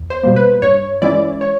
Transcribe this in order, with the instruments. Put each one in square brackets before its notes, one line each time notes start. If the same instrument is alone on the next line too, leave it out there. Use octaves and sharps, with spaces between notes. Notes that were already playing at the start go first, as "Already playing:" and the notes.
Already playing: [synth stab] E2
C5
B2 G3 A#3
B4
G2 C#5
E3 G#3 C#4 E4 D5
C#5